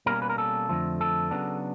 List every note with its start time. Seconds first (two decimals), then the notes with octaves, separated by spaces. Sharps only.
0.06 B2 G3 A#3 C#4 A#4
0.22 B4
0.29 A#4
0.38 A4
0.69 F2 D3 F3 A3
1.01 A4
1.31 C#3 F#3 B3 D4